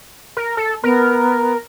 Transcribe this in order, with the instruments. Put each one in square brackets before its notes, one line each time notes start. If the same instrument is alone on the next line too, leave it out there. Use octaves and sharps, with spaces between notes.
[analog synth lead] A#4
A4
[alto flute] B3 [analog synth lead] A#4